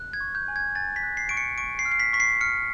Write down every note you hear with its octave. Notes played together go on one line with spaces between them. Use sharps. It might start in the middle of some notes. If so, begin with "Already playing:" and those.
Already playing: F#6
G#6
C#6
G6
G#5
G#6
G#5 A6
B6
F#6
C7
C#6 D7
C#7
C#6 D7
C7
F6
C7
B6
C#6 B6
C7
F6 C#7